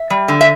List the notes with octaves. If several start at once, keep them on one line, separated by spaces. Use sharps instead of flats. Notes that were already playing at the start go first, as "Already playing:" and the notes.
Already playing: E5
G3
D3
E5